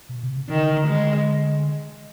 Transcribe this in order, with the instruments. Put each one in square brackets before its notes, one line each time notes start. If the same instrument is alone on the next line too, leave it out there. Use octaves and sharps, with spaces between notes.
[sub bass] B2
C3
C#3
[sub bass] D3 [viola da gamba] D#3
[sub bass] D3
[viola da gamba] G#3